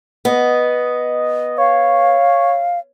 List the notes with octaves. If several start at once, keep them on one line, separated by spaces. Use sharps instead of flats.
B3 D#5
C#5 F5